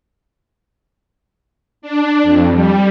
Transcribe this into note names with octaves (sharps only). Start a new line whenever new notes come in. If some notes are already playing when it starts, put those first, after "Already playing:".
D4
F2
G3